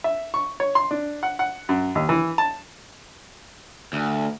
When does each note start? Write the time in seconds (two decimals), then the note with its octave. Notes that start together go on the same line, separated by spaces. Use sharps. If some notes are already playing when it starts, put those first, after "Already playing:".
0.04 E5
0.34 C#6
0.60 C#5
0.75 C6
0.91 D4
1.23 F#5
1.39 F#5
1.69 F#2
1.95 D#2
2.09 E3
2.38 A5
3.93 D2